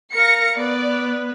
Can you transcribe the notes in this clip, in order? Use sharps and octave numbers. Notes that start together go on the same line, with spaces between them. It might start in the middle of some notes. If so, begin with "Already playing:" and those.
A#4 F5 A#6 C#7
B3 B4 D5